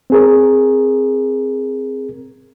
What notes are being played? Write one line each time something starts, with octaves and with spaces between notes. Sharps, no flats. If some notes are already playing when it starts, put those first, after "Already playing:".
C4 G#4 A#4